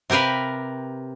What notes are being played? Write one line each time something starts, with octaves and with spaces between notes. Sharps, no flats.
C3 G4 A#4 B4 F5